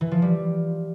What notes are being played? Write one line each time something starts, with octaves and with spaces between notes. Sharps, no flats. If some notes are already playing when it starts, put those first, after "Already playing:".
E3
F3
G3